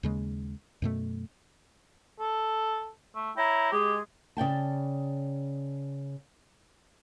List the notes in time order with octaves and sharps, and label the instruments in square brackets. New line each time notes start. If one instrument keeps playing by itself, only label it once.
[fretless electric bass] D#2 C#3 G#3
F#2 B2 A3
[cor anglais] A4
A3
[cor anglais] E4 [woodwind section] C#5 G5 A#5
[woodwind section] G#3 G#4 [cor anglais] G4
[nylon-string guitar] C#3 D5 G5 A5